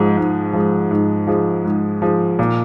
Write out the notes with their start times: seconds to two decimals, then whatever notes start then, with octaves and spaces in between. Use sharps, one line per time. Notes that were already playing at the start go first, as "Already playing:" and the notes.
Already playing: G#2 F3 G#3
0.17 G#2
0.53 F3 G#3
0.91 G#2
1.27 F3 G#3
1.65 G#2
2.02 F3 G#3
2.39 A#2